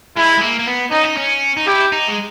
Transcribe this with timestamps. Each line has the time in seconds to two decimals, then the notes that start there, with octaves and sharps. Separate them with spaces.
0.16 G#3 E4
0.38 G#3
0.41 A#3
0.59 A#3
0.67 B3
0.92 C#4 D#4
1.04 D#4
1.17 C#4
1.57 D#4
1.67 E4 G4
1.92 D#4
2.08 G#3